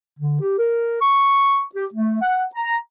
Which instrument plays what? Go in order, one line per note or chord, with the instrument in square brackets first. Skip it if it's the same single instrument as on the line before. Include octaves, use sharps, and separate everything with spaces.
[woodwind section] D3
G4
A#4
C#6
G4
A3
F#5
A#5